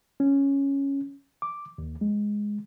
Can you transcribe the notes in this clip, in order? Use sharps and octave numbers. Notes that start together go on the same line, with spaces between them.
C#4
D6
D#2
G#3